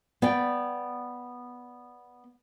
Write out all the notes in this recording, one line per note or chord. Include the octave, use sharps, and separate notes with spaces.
B3 D5 G5